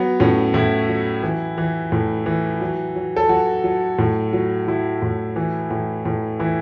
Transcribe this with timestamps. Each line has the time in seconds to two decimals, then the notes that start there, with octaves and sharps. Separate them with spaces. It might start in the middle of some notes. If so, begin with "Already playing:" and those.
Already playing: F#3 B3
0.20 A2 C#4
0.54 A2 E4
0.89 F#3
1.23 E3
1.58 E3
1.92 A2
2.26 E3
2.61 F#3
2.96 F#3
3.16 A4
3.29 F#3 F#4
3.64 F#3
3.99 A2
4.33 F#3
4.67 F#3 E4
5.02 A2
5.36 E3
5.71 A2
6.05 A2
6.40 E3 E4